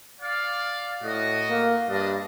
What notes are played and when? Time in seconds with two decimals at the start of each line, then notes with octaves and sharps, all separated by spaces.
0.21 D5 F5
1.03 A2 F#4 D#5
1.49 A#3
1.90 G2 D4 D#5